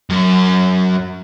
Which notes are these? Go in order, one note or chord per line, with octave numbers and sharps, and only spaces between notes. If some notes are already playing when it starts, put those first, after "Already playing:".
F#2